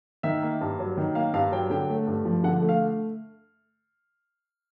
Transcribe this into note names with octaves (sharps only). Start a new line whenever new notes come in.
D#3 E5
A#3
G2
F#3
D#3
A#3 F5
G2 F5
F#3 G5
D3 G5
A3
G2
F3
D3 F#5
A3
F5